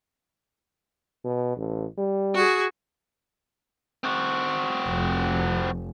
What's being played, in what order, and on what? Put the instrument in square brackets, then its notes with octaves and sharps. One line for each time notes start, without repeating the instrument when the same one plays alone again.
[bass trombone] B2
A1
G3
[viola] F#4 G#4
[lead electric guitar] C4 F#4
[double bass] F1